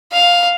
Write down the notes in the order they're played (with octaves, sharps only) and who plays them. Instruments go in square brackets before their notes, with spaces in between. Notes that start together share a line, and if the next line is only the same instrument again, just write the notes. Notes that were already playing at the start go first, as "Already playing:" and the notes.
[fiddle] F5